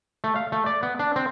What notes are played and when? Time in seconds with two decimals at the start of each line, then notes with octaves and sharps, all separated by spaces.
0.24 A3
0.36 F5
0.52 A3
0.66 D5
0.83 B3
0.99 D4
1.16 C4